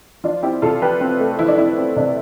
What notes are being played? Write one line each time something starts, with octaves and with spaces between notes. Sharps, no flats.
F3 D4 F4
C4 E4 G4
C3 F4 A4
F3 G4 B4
C4
A3
F3 E4
D4
C4 E4
C4
C3 D4